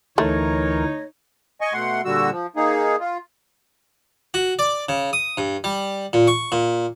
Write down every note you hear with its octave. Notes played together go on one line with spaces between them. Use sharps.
D2 E3 A3 D#4 A#4 C#5
D#5 G#5 C#6
B2 A3 F#5 C6
A#2 D3 G3 F#4 E6
F3
A#3 D#4 G#4
F4
F#4
D5
C#3
D#6
G2
G3
A#2
C#6
A#2